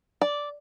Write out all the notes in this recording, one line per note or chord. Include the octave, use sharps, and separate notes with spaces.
D5